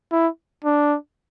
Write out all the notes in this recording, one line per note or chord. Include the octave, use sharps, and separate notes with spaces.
E4
D4